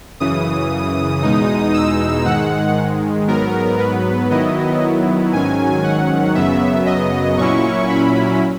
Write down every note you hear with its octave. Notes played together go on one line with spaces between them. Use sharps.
F#2 C#3 E3 D#6
E2 B2 G#3 D#4
E6
G#2 D#3 G#3 F#5
G#2 F#3 B3 A#4
B4
D#3 F#3 B3 E4 D#5
G#2 D#3 F#3 C#4 G#5
F#5
F#2 C#3 F#3 B3 E5
D#5
A#2 F#3 C#4 E4 C#6
B5